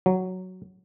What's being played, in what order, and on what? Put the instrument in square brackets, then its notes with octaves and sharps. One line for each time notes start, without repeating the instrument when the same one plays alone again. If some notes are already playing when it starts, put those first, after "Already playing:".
[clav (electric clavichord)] F#3